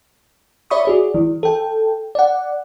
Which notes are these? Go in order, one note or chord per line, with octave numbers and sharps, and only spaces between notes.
C#5 D5 E5 B5 C#6 D#6
F#4 G#4 D5
E3
A4 G5
D5 F#5